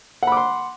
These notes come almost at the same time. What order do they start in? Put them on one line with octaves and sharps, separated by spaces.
F#5 B5 D6 C6